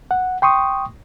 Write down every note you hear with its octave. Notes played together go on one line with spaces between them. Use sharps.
F#5
G5 C6 C#6 D#6